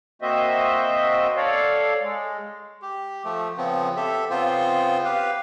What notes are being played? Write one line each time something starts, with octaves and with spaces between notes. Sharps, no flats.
A#3 C4 F#4 C5 D#5 E5
A4 C#5 D5 F5
G#3
G4
F3 A3
C#3 F3 B3 C4
G4 A4 E5
C#3 B3 C4 F4 C5
G4 B4 F5